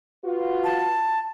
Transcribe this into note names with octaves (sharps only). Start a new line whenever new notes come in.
F4 F#4 B4
A5